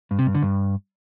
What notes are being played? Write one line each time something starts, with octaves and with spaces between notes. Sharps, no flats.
G2
C3
G2
D3
G2